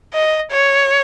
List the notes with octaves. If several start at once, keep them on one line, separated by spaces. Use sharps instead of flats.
D#5
C#5